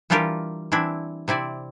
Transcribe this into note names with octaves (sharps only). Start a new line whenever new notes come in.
E3 G3 D4 F4 G4 A#4
E3 C4 D4 E4
C3 C4 E4 D5